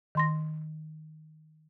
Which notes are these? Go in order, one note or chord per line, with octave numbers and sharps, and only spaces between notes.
D#3 C6 A#6